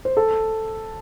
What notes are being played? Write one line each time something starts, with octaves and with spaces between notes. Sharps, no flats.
C5
A4